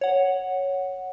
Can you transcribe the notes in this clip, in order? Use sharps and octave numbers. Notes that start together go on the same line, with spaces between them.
C#5 F#5